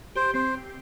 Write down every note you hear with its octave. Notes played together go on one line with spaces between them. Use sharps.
G4 C5
C4 C5